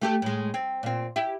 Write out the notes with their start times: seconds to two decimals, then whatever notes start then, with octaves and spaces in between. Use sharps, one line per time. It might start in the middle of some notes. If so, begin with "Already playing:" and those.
0.02 A3 G4 A4
0.22 A2 G#3
0.54 C4
0.83 A#2 C4
1.16 E4 G4